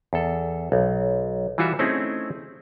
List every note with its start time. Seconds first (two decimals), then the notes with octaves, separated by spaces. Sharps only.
0.13 E2 A4
0.72 B1
1.58 E3 G3 F4 F#4 E5
1.79 A3 C4 C#4 D#4 E4 G#4